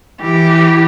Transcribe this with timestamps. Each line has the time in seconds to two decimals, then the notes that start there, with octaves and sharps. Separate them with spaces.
0.20 E3 G4